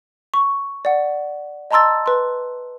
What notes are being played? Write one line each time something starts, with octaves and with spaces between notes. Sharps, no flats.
C#6
D5 F#5
D#5 A5 A#5 C6 E6 A6
B4 C6